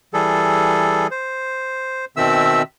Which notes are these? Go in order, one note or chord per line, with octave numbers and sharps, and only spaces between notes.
E3 G3 G#4 A4
C5
B2 D#3 C4 E5 E6